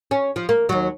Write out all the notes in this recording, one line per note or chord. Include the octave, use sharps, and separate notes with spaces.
C#4
F3
A#3
D#2 F#3